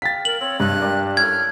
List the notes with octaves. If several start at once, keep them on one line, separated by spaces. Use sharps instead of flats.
F5 G5 A6 B6
A#4 F#7
C4 C#5
G2 D#5 F#6
A#4 D5 G5
C#4 E4 A4 F6 G#6